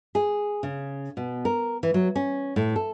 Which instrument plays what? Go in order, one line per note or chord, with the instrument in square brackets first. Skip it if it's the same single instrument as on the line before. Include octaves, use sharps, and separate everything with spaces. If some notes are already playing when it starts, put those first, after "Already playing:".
[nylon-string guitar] G#4
C#3
B2
A#4
E3
F#3
C#4
A2
A4